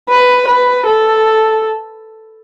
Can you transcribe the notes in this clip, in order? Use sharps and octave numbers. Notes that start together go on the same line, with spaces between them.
B4
B4
A4